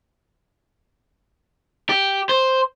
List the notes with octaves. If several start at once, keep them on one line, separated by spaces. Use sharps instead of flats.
G4
C5